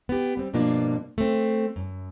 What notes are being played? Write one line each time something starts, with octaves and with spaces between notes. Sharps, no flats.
B3 G4
G3 C4
G2 B2 F3 A#3 D4 F4
A3 C4
F#2